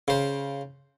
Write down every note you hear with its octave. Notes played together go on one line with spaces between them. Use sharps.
C#3 C5